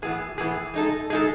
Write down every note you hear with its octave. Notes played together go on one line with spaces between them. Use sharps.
A2 E3 B3 G#4
A2 E3 B3 G#4
G#3 D#4 A4
G#3 D#4 G#4 A4